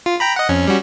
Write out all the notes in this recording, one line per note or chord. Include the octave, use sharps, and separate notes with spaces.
F4
G5 A#5 B5
D#5 F#5
F2 C#4
G3 C#4 F#4